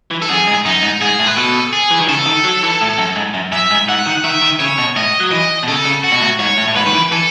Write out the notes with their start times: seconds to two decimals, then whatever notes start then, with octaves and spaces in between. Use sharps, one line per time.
0.11 E3
0.22 A4
0.29 F#2 G#4
0.47 G#2
0.65 F#2 D#4
0.83 G#2
1.02 G#2 G#4
1.20 A2
1.27 B4
1.36 B2 A4
1.73 G#4
1.91 E3
2.00 D#3
2.08 C#3 A4
2.26 D#3
2.44 F#3
2.63 E3
2.81 A2
2.98 F#2
3.16 G#2
3.34 F#2
3.52 F#2 E5
3.71 G#2
3.88 G#2 F#5
4.06 D#3
4.24 D#3 E5
4.42 D#3
4.60 C#3 C#5
4.78 B2
4.96 A2 D#5
5.20 F#3
5.31 E3 D#5
5.63 B2
5.68 C#3 A4
5.86 C#3
6.04 F#4
6.12 B2
6.21 A2
6.39 G#2 C#5
6.57 A2
6.68 A2
6.76 G#2 B4
6.86 D#3
6.93 E3
7.12 E3 A4